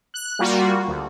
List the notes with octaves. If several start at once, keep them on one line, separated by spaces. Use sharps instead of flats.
F#6
G3 A#3 F4 F#4
D2